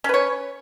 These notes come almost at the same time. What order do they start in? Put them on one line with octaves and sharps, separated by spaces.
C#4 B4 C#5